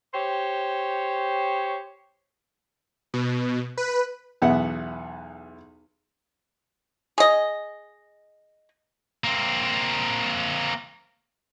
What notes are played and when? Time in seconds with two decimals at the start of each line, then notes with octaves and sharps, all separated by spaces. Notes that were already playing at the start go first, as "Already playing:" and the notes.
0.14 G4 C5 C#5
3.14 B2
3.77 B4
4.42 B1 E2 B3 E5 F#5
7.18 G#4 D#5
9.24 A#3 C4